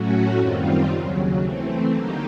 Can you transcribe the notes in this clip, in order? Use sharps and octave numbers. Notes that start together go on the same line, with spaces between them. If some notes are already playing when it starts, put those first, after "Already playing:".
Already playing: A2 F#3 A3 C#4 F#4
F#2 D#3 G3 C4 F4
D#2 C#3 F#3
E3 A3 C4
D3 F#3 A#3 D#4 G4